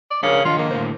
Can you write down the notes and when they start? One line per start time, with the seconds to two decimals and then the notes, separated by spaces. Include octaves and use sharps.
0.11 D5
0.23 C#3 D4 A#4 C#5
0.45 D#3 D4 F4 D#5
0.58 A#3
0.71 A2 D3 C5